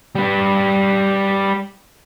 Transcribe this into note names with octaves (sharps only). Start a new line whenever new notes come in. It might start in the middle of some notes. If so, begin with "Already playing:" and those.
G3 B4